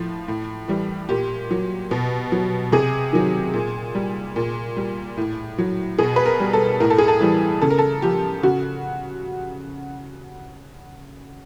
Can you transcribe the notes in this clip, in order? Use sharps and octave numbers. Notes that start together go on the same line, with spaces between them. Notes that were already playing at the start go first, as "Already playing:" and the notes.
Already playing: A2 F3
A2
E3 G3
A#2 G4
F#3
B2
F#3
C3 G#4
D#3 F#3
A#2
G3
A#2
G3
A2
F#3
B2 G#4
B4
A#4
G3
A4
A2 A#4
A4
G#4
A4
E3 G3
C#3 A4
A#4
A4
F3 G4
C#3 F#4